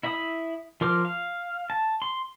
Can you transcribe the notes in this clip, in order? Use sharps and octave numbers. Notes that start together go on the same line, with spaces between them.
E4 E5 B5 D#6
F3 A#4 C6 D6 F6
F5
A5
C6